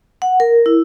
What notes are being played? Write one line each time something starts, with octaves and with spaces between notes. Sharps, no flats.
F#5
A#4
E4